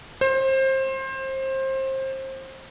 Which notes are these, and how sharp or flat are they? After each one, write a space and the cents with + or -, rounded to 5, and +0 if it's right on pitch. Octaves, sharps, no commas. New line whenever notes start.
C5 +25